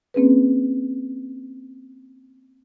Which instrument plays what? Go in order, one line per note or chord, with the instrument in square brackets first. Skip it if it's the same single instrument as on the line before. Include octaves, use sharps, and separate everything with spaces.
[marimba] A#3 C4 C#4 G#4 B4